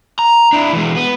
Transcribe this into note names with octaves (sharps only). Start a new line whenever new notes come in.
A#5
D4 E4
E3 G#3
B3